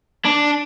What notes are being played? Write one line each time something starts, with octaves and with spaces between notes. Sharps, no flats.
D4